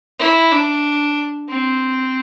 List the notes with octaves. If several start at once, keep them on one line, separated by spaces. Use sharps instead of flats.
E4
D4
C4